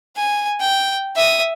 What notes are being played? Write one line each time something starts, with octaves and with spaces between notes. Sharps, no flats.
G#5
G5
E5 D#6